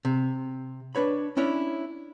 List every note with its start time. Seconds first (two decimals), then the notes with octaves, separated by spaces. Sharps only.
0.05 C3
0.95 D4 B4 C#5 B5
1.37 C#4 D4 E4 C#5